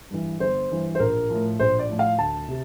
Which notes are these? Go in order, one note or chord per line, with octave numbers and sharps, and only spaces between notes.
G2 E3
G1 C5
G2 E3
C5
A#1 A#4
A2 F3
A#1 C5
D5
A2 F3
F5
D2 A5
C3